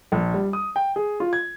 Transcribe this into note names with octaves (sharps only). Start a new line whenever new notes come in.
A#1
G3
D#6
G5
G#4
F4
G#6